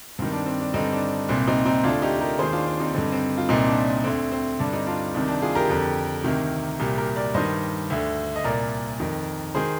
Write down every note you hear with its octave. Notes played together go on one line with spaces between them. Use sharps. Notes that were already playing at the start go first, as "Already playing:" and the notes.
G2 D#3 C4
D4
C4
D4
G2 D3 C4 D#4
D4
C2 A#2 C4
C4 D#4
C4 D#4
D2 D3 D4 F4
D#4 G4
G4 A#4
D#2 D#3 G#4 C5
D4 F4
D4
C4 D#4
G2 D3 C4 D#4
C4
F4
C2 A#2 C4 D#4
D4
D2 D3 C4
C4
G2 D3 D4
C4 D#4
D4 F4
C2 C3 D#3 D4
D4
F4 G#4
G4 A#4
F2 D3
D2 C3 D#3
C2 A#2 G4 A#4
G4 A#4
A#4 D5
G2 D#3 C5 D#5
D2 D3
D#5
C2 A#2 A#4 D5
F2 D#3
D#3 G#4 C5